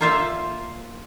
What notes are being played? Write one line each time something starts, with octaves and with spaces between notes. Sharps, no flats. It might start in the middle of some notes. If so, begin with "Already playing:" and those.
A#3 F4 C5 E5 F5